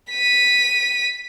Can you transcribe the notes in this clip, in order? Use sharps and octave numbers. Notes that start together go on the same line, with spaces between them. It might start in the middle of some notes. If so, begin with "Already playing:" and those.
B6 D#7